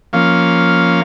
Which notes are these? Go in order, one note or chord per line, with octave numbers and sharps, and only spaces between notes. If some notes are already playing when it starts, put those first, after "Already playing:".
F3 A#3 C#4 F5